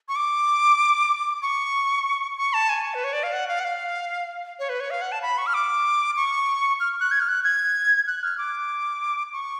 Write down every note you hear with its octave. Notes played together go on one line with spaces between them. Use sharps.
C#6
D6
C#6
C#6
A5
G#5
B4
C#5
D5
F5
F#5
F5
F#5
F5
C#5
B4
C#5
F5
F#5
A5
B5
C#6
F6
D6
C#6
F6
F#6
G#6
F6
F#6
G#6
F#6
F6
D6
C#6